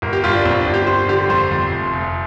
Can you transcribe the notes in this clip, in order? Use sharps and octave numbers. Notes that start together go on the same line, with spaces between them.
G1 A#4
G4
G1 F4
D4
G1 C4
D4
G1
G4
G1 C5
D3 G4
F2 C5
F2
F1
F1